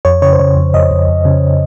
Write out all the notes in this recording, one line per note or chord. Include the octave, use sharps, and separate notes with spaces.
F2 C#5
C#3 C#5
C5
C#3 C#5
F2
F2 D#5
F2
F2
C#3